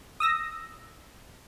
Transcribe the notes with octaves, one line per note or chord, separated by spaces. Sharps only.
D#6 E6 A#6